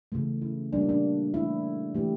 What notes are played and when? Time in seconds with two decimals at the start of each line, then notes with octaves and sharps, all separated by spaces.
0.12 C#3 E3 A3
0.42 E4
0.73 A#2 G3 A#3 D4
0.81 E4
0.89 D4
1.34 E3 A3 E4
1.95 E3 A3 G4